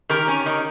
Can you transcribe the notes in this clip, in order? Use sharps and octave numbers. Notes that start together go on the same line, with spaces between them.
D#3 G4 A#4
C#4
D#3